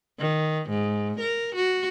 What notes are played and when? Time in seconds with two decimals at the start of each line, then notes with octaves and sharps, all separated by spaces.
0.19 D#3
0.69 G#2
1.20 A#4
1.55 F#4